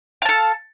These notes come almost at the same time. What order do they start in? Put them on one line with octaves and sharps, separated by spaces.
F5 A5 A4